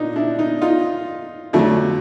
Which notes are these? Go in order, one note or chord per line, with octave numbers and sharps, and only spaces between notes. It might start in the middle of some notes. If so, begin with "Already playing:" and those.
Already playing: A#2 A#3 D4 D#4
D4 E4
D#4
D#4 F4
F2 D3 F#3 A3